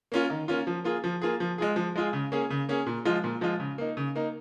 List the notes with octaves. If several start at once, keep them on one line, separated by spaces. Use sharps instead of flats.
A#3 C#4 F4
D#3
A#3 C#4 F4
F3
A#3 F4 G#4
F3
A#3 F4 G#4
F3
G#3 F4 G#4
F3
G#3 F4 G#4
C#3
A#3 C#4 G#4
C#3
A#3 C#4 G#4
A#2
F3 G#3 F4
A#2
F3 G#3 F4
C#3
A#3 D#4
C#3
A#3 D#4